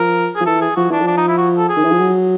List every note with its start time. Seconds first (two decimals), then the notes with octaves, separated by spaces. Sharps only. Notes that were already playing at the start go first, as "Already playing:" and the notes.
Already playing: F3 A#4
0.36 F3 G#4
0.46 E3 A4
0.61 G#4
0.76 F3 F#4
0.90 E3 D4
1.02 F3
1.07 D4
1.17 D#4
1.28 E4
1.38 F#4
1.57 A4
1.69 G#4
1.76 D#3
1.84 E3
1.92 F3
1.99 F#3